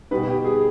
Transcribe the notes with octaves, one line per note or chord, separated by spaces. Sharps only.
B2 G3 B3 D#4 B4
G4
G#4